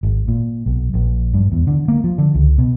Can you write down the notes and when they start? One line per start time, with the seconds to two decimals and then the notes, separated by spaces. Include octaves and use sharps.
0.03 G#1
0.28 A#2
0.66 B1
0.94 A#1
1.33 G2
1.52 E2
1.67 D3
1.88 A#3
2.04 F3
2.18 D3
2.35 C#2
2.58 B2